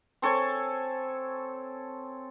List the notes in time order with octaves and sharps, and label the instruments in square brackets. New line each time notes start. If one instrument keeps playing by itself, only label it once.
[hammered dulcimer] C4 A4 C#5 G#5